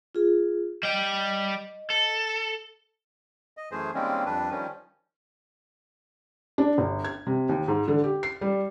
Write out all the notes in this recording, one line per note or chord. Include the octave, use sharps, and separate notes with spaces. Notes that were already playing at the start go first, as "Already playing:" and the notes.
F4 G#4
G3 D#5 G5
A4
D#5
F#2 E3 A3 G#4 C5
D#3 G3 G#3 A#3 C4 C#4
F2 G3 D4 B4
D#3 F3 G3 C#4
D4
G1
G#6
C3
D#2
G#2
D3
G4
C7
G3